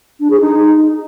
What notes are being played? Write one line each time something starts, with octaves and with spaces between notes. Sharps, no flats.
D4
G#4
D#4